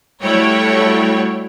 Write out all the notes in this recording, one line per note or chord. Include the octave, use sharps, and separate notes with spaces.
G3 A3 E4 F#4 C#5 G5